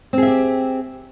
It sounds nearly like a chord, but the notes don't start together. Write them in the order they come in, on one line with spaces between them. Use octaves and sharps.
C4 G#4 E5 G4